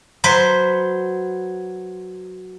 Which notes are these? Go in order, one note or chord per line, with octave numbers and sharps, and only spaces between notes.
F#3 B4 C5